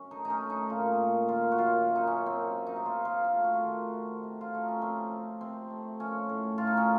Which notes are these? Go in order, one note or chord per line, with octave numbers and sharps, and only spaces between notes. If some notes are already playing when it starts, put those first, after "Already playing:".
Already playing: F#2 C#4
A3 D#4
D#4
C#4
A3
D#4
A#2 F4
A#2
D#3 F4
F#4
F#2 F4
F#2
D#4
C#4
A#3
C4
F#3
D#4
C3
F4
C3 F4
F4
A3
F#4
F4
D#3 F#4
C3
C3
F4
A3 D#4
C#4
F3 C4
C3
C3 C4
A3
F3 C#4
A2
A2 F4
D#4
C#4